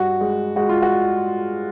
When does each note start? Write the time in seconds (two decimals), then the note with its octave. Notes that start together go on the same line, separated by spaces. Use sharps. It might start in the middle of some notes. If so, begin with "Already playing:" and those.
Already playing: G2 F#4
0.21 G#3
0.56 G#3 F#4
0.69 F4
0.82 F#4